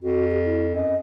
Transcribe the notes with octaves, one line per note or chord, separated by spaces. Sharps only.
F2 F#4
G4
E4
F#2 D#5